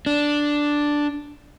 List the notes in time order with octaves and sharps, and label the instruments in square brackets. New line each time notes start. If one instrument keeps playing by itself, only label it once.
[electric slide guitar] D4